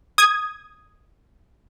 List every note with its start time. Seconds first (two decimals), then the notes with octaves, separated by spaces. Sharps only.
0.18 D#6 G#6